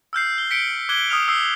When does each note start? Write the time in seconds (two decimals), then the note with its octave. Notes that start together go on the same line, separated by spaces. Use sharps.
0.13 E6 F6 G6 C7
0.38 G7
0.51 B6 C#7 D7 G7
0.89 D6 F#6 G#6 G7
1.10 D#6 F6 F7
1.28 D#6 E6 C7